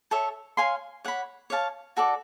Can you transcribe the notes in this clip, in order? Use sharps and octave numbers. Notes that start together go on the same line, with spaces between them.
A4 C#5 E5
C#5 F5 G#5 C6
C#5 F#5 B5
C#5 F5 A5
F#4 A4 D5